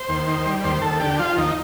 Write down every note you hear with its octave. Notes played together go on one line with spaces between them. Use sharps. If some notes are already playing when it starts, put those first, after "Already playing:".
Already playing: C5
D#2
D#3
G3
D#2 C5
D#2 A4
D3 G4
F3 F4
D#2 D#4